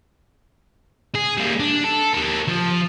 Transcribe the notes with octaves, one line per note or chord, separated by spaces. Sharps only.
G#4
G3 A#3
D4
A4
G4 A#4
F3